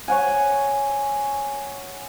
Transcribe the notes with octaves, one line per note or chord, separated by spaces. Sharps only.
C#5 F#5 G#5